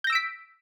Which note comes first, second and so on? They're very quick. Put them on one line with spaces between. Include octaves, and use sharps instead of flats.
G6 A#6 E6 D7 B6